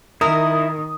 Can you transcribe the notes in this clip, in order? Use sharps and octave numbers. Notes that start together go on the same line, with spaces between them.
D#3 E4 A#4 E5 D#6